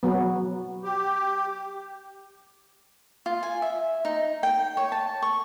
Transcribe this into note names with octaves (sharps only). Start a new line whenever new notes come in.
F#3 B3
G4
F4
G#5
E5
D#4
G5
C#5
A5
C#6